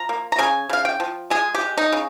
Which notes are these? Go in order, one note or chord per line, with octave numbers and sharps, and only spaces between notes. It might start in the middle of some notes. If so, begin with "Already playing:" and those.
Already playing: F3 A#5
A#3
A#5
C#3 G#5
C#3 F5
G5
F3
G#3 G#4
G4
G#3
D#4
C#3